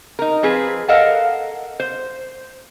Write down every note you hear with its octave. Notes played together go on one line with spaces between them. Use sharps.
D#4 A#4
F3 C4 G#4 B4
A4 A#4 D#5 F5 F#5 A5
C5